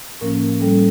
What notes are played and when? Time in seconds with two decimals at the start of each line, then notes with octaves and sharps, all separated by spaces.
0.21 A2 F3 A#3 C#4 A#4
0.61 A2 G3 C#4 A4